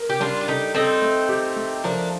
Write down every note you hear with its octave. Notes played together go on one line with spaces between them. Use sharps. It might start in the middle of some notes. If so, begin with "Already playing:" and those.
Already playing: A#4
G4
G3 D4 F4
F4
D#4 G4 A4
C4 D#4 A4
A3
G4
A3
F3 A#3 D4